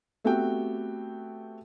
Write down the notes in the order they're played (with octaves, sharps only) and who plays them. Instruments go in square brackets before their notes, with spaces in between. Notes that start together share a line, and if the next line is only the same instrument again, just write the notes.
[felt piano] A3 B3 C4 F#4 G4 G5